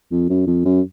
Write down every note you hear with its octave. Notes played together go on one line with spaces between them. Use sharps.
F2
F#2
F2
F#2